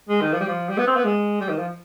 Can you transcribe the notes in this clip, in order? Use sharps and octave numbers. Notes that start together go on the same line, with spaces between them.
G#3
D#3
F3
G3
F3
G3
B3
C4
B3
G#3
G3
D#3
F3